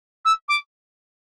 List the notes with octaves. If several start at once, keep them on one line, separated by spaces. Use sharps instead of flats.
E6
D6